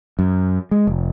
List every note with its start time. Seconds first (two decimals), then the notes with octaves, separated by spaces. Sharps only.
0.19 F#2
0.71 G#3
0.87 F1